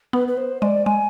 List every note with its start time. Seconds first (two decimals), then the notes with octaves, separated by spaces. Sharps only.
0.13 B3 B4
0.28 B4
0.37 C5
0.61 G#3 D5
0.85 G#3 G#5